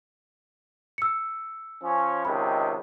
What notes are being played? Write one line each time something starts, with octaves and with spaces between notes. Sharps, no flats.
E6 C#7
F3 C#4
C#2 C3 D#3 B5